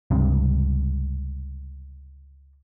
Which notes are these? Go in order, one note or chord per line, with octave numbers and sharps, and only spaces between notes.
C#2 G2 C3